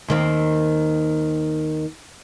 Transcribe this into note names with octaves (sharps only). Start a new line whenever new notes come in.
D#2 D#3 C4